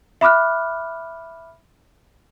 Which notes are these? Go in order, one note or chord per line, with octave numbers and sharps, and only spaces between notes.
E5 B5 D6 F6 F#6